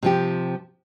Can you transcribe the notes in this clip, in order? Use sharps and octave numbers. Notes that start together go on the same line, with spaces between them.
C3 F3 G4